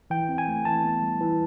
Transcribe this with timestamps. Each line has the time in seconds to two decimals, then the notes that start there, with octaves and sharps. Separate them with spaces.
0.10 E3 G5
0.29 C4
0.38 G#5
0.48 A3
0.65 E3 A5
0.84 B3
1.03 G3
1.21 E3